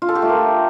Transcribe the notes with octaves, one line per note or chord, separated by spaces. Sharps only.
F4
A4
G4
A3
A#4